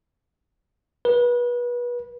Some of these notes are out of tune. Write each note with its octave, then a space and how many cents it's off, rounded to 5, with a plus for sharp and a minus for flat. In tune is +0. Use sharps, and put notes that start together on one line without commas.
B4 -30